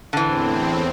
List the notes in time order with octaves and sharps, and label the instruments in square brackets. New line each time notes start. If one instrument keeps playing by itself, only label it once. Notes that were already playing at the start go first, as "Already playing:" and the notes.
[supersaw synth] E2 A2 C4 [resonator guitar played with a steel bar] D3 E3